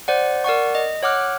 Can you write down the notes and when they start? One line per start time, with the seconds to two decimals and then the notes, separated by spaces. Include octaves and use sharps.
0.08 C5 D5 F#5
0.44 A#4 D5 F#5 C#6
0.75 D#5
1.03 C#5 F#5 D6 F6 F#6